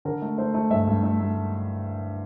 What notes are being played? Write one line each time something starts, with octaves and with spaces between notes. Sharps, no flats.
D3 A#4
A3
A3 C5
A3
G2 E5
G2
A3
A3